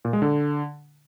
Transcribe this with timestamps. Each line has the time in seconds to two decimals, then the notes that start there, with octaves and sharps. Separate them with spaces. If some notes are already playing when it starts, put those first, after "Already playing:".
0.05 A#2
0.13 G#3
0.22 D3